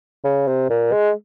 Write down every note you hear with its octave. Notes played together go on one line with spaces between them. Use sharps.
C#3
C3
A#2
G#3